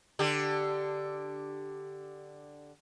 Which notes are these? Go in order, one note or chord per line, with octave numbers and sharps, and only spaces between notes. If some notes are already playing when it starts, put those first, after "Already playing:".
D3 G4